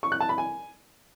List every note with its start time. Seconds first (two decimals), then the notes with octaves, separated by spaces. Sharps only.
0.03 C#6
0.12 F#6
0.20 A5
0.29 B5
0.38 G#5